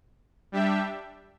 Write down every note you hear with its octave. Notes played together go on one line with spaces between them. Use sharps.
G3 D4 G4 E5